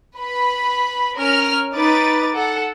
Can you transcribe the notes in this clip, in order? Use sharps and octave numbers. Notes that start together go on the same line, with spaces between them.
B4 B5
C#4 A#4 F6
D#4 B4 D6 A6
A4 F#5